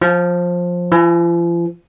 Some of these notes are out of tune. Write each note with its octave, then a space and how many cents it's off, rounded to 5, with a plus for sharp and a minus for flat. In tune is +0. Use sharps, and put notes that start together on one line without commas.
F3 +15
F3 -40